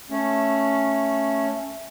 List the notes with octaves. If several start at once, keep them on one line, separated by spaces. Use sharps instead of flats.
A3 C#4